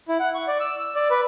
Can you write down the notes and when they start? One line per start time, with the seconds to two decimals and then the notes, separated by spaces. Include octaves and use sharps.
0.08 E4
0.20 F#5
0.35 C#6
0.48 D5
0.60 E6
0.80 E6
0.95 D5
1.10 B4